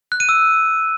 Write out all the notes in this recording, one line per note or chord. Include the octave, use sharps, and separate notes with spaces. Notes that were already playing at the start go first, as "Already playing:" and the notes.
F#6
D#7
E6